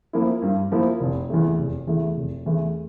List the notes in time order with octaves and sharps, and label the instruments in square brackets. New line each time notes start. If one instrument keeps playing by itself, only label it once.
[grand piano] F3 A#3 E4
G2
F3 A#3 E4
F1
E2 E3 A3
F1
E2 E3 A3
F1
E2 E3 A3